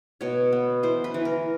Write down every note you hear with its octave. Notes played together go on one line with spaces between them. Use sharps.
B2 C#5
B3
E3 C5
B4
E3
A#4